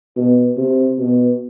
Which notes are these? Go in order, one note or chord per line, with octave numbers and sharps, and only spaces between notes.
B2
C3
B2